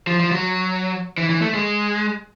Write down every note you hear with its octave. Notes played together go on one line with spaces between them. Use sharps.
F3
F3
F#3
E3
E3
A3
G#3